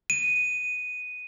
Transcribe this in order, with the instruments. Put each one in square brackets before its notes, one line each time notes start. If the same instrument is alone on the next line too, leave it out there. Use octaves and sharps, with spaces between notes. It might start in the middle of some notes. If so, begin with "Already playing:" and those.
[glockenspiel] D#7